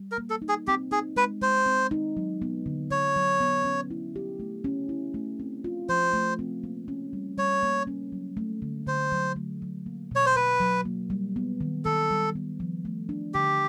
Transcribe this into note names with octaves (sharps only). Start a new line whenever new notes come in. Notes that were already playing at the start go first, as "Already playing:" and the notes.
Already playing: G3
A#4
A#3
A4
D#4
G#4
C4 G4
D#4 G#4
G#3 B4
G#3 C5
C4
D#4
F#3
B3
D3
D3 C#5
F#3
B3
C#4
E4
G4
A3
C#4
E4
A3
C4
F4
F3 C5
A3
C4
A#3
C#4
G3
G3 C#5
A#3
C#4
F#3
A3
D3
D3 C5
F#3
A3
F#3
A#3
B2 C#5
C5
B2 B4
F#3
A#3
G3
B3
D#3
D#3 A4
G3
B3
F3
A3
D4
D3 G4